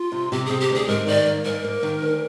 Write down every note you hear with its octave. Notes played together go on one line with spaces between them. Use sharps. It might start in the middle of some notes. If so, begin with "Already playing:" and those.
Already playing: F4
C3
C3 G4
C3 G#4
G4
D2 G#4
G#2 A#4
D#3 D5
A#3
G#2 A#4
A#3
D#3
D2